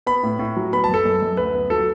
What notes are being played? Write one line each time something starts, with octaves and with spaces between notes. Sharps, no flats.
B3 B5
A2
A2
F#3
B3 B5
A5
F#2 A4
F#2
F#2
D2 B4
B3
F#3 A4